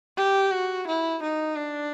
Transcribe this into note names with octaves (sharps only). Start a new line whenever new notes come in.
G4
F#4
E4
D#4
D4